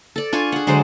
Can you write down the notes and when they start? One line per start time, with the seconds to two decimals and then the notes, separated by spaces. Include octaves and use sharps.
0.16 A4 D5
0.33 D4 F4 G#5 C#6
0.52 G#4 F#5
0.67 D3 F#3 G#3 C5